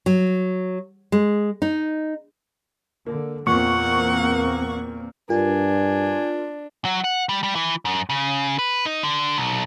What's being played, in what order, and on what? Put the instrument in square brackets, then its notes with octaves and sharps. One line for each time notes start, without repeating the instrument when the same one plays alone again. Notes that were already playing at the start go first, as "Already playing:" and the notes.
[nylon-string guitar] F#3
G#3
D#4
[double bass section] D3 [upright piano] A#3
[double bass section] E2 A#3 C4 [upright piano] A#2 [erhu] F#5 [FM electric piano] C#6
[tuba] G2 [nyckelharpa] D4 [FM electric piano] F4 A#4 [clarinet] G#5
[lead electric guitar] F#3
F#5
G3
G3
E3
F#2
C#3
B4
D#4
D3
B1